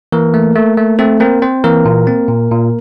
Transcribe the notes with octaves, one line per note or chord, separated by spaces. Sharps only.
E3 A#3 A#4
A3
A3
A3
A3 C4 A4
A#3 C4 A#4
C4 C5
E3 A#3 A#4
A#2
C4
A#2
A#2